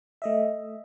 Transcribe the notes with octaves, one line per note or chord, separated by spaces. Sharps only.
A3 D#5 E5